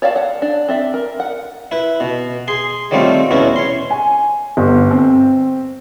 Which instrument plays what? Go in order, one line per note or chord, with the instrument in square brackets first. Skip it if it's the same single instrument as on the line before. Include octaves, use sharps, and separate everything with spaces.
[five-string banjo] C#5 D5 F5 F#5 A5
F#5
D4
C4 D5 E5
A#4
F#5
[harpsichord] E4 B4
B2
G#4 C6
D#3 F#3 G3 A3 C4 F4
E2 B2 C#4 E4 F#4
C#5 C6
[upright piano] G#5
G1
C4